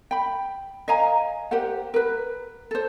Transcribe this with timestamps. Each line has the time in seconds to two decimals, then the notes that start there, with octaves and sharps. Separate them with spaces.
0.11 G5 B5
0.88 D#5 F5 G#5 A#5
1.51 G4 A#4 C5 F#5
1.94 A#4 B4
2.71 A4 C5